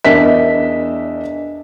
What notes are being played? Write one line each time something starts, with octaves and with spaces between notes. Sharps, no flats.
E2 D4 A#4 D#5 E5 B6